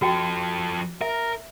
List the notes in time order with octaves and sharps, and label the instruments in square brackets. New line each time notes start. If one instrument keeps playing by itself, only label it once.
[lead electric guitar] F3 A4 [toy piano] F#4 G5
[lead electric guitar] A#4 [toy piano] E5